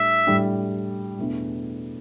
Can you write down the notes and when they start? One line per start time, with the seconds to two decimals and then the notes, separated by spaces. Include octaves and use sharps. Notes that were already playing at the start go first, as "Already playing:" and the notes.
Already playing: A2 G3 D4 E5
0.26 A2 G3 D4
1.18 E2 B2 A3 D4